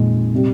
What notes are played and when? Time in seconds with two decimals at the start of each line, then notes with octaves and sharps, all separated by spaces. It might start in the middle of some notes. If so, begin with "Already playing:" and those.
Already playing: F2 A#2 D#3 G#3
0.34 C3 G3